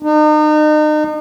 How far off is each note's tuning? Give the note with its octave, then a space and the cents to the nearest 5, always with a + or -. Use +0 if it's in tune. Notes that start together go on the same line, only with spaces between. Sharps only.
D#4 -35